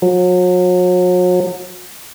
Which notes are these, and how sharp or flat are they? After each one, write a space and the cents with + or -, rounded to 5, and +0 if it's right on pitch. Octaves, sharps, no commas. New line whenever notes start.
F#3 -40